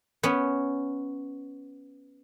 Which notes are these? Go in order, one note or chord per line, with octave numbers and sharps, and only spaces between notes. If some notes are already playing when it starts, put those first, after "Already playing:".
B3 C#4